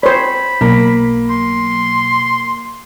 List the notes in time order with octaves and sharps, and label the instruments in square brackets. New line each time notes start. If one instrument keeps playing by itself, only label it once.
[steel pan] C5 C#5 [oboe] B5
[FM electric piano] B1 [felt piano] A#3
[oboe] C6